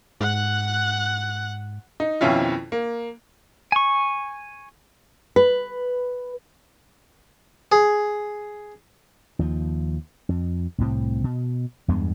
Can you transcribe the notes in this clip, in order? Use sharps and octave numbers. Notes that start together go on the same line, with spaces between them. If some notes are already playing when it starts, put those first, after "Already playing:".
G#2 F#5 F#6
D#4
F2 B2 D#3 C#4 E4 F4
A#3
G#5 C#6
B4
G#4
D#2 F3
F2
C2 A2 C4
B2
E2 G2 G#3 B3